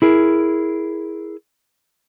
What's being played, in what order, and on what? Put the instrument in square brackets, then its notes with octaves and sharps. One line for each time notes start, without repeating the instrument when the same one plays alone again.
[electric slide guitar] E4 G#4 A#4